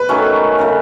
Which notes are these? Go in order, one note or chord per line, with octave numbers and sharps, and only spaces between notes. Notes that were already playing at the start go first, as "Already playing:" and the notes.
Already playing: B4
D#3 F#3 A3 C#4
C#3 F#3 A3